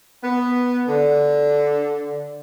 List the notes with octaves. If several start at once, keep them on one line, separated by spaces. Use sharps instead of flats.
B3
D3